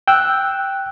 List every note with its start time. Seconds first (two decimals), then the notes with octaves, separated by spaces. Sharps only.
0.08 G5 E6 F#6